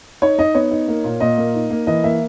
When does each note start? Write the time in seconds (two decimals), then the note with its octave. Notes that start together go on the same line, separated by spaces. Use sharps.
0.22 D#4 C#5
0.38 D#4 D#5
0.55 B3 C#5
0.71 D#4
0.88 A#3
1.04 A#2
1.20 A#2 D#5
1.38 A#3
1.55 D#4
1.70 A#3
1.87 E3 D#5
2.04 A#3 E5